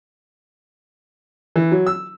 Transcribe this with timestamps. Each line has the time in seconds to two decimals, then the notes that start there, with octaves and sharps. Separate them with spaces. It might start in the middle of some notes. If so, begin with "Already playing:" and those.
1.56 E3
1.72 F#3
1.87 E6